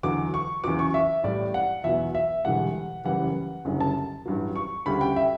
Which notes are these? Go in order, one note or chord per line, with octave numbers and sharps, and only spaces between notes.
E2 D3 F#3 D6
C#6
E2 C#3 F#3 D6
C#6
E5
A1 A2 G3 D5
F#5
E2 B2 F#3 E5
E5
E1 E2 D3 G3 F#5
F#1 F#2 E3 G3 F#5
F#1 F#2 D3 G3
A5
A1 G2 F#3
C#6
D2 C#3 G3 B5
G5
E5